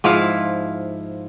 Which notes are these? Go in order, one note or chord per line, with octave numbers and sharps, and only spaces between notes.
G#2 F3 E4 F5